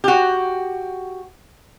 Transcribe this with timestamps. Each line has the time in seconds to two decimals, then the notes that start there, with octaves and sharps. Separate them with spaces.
0.04 F#4 G4